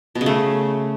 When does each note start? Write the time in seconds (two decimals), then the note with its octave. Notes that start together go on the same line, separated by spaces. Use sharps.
0.15 B2
0.21 C#3
0.26 A3